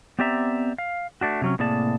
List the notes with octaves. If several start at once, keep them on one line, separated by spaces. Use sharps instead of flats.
B3 C4 G4 D5 E5 A#5
F5
A3 D4 F#4
C3 F#3 C#4
A2 C3 A#3 G#4 D5 A5